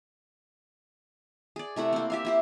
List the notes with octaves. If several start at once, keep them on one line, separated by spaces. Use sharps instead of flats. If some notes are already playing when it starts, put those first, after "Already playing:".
G#4 D5
C3 A3 E4 F#5
A#3 C4
G4 E5 F5
E4 G4 C5